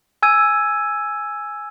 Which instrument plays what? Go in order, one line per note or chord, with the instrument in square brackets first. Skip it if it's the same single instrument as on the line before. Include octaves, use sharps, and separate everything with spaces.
[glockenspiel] G#5 E6 G#6 D#7